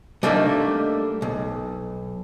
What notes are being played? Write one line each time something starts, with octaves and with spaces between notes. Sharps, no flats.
G3 A3 A#3 D4 D#4
B1